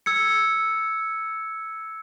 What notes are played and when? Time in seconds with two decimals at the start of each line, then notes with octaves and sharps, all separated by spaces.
0.06 E6 G#6 C#7